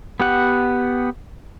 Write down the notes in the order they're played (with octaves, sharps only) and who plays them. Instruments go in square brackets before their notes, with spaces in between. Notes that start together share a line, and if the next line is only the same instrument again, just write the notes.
[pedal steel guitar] B3 G4 F#5